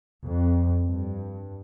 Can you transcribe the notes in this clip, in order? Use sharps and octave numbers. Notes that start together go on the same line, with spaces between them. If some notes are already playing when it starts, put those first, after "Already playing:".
F2
G2